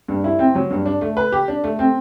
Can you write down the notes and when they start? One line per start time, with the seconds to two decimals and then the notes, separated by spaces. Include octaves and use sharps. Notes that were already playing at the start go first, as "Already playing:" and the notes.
0.08 G2
0.24 E4
0.39 C4
0.55 F#3
0.71 G2
0.86 D4
1.01 A3
1.17 B4
1.32 G4
1.48 D4
1.64 A3
1.79 C4